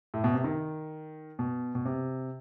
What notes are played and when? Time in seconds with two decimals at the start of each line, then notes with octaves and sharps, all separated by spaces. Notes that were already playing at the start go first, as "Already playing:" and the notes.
0.14 A2
0.24 B2
0.34 C3
0.44 D#3
1.39 B2
1.75 B2
1.85 C3